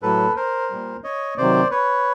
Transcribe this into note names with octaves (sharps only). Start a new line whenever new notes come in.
A2 F#3 A4 B4
A#4 C5
A#2 G3
C#5 D#5
C3 D#3 F#3 C5 D5
B4 C#5